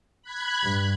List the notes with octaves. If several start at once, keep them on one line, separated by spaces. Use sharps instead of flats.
B5 F#6 G#6
G2